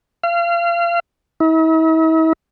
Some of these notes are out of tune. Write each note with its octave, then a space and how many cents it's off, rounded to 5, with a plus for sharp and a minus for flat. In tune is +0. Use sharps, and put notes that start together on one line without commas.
F5 -30
E4 -45